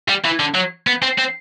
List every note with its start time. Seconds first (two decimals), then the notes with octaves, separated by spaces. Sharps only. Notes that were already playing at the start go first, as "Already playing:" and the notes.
0.09 G3
0.25 E3
0.40 D3
0.55 F#3
0.87 B3
1.02 C4
1.18 C4